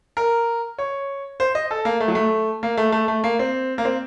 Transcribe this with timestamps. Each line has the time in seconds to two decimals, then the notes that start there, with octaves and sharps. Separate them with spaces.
0.17 A#4
0.78 C#5
1.40 C5
1.55 D#5
1.71 A4
1.85 A#3
2.00 A3
2.08 F#3
2.15 A3
2.63 A#3
2.78 A3
2.92 A3
3.08 A3
3.24 A#3
3.39 C4
3.78 A#3
3.85 C4